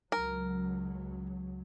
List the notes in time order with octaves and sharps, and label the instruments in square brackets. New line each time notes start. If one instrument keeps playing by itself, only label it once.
[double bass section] C#2 F#3 [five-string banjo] A#4